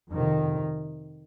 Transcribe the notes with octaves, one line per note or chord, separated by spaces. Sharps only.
F2 C3 D#3